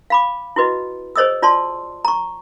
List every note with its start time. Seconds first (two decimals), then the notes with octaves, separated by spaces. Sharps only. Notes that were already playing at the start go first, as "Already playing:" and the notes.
0.10 F5 B5 D6
0.56 E4 F#4 B4 D#5
1.16 G#4 C5 C#5 D#5 D#6 E6
1.42 F4 D5 A5 C6
2.05 A#5 C#6